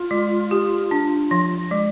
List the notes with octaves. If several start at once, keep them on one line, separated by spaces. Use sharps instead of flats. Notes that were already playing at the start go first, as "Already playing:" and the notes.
Already playing: F4
G#3
G4
D4
F3
G#3